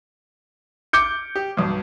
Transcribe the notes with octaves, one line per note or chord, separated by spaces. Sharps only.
D6 G6 C#7
G4
B1 G2